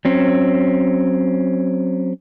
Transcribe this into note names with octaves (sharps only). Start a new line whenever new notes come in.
F#3 C4 C#4